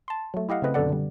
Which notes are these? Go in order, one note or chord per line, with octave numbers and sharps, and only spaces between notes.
A5 C6
F#3 A3
E4 G4 D#5 F5 F#5
C#3 A3 C4 B4 D#5
F#2 B2 D3 A4 D5 F#5
D3 G3